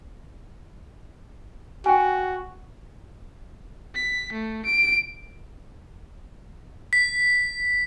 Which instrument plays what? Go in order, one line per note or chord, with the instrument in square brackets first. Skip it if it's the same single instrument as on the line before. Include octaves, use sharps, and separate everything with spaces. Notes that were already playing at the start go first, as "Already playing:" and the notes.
[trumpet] F#4 [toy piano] G5 G#5
[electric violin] B6
A3
D7
[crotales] B6